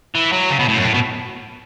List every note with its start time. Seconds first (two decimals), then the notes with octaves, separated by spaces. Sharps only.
0.15 E3
0.32 F#3
0.50 C#3
0.59 B2
0.68 A2
0.76 F#2
0.85 A2
0.94 B2